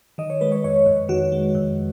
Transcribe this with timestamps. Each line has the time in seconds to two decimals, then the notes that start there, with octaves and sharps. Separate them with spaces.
0.18 D#3 D#5
0.30 C#5
0.41 G#3 B4
0.52 C#5
0.64 F2 C#5
0.86 F2
1.09 D#3 F#4
1.32 G#3
1.55 F2